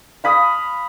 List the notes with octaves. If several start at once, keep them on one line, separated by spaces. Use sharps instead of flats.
F5 B5 D#6